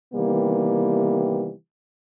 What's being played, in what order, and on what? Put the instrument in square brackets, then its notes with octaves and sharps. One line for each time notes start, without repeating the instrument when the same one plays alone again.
[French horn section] C3 D#3 E3 G3 A#3 B3